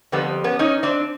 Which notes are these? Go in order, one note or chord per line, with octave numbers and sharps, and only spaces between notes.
F2 D3 G3 B3
B3 C#4
C#4 D#4
C4 D4